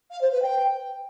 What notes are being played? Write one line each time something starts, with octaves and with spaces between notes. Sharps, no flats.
F5
C5
B4
G5